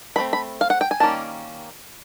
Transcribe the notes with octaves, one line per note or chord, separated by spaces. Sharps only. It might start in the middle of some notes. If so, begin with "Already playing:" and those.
E3 A3 C4 B5
B5
F5
F#5
G5
G#5
D#3 G3 A#3 C#4 A5